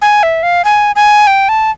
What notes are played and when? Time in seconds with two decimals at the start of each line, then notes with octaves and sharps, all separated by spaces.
0.02 G#5
0.23 E5
0.43 F5
0.65 G#5
0.96 G#5
1.27 G5
1.49 A5